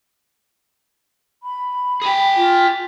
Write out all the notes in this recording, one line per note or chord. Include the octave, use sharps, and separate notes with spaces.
B5
G#4 G5
F4